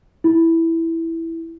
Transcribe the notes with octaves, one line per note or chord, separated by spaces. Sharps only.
E4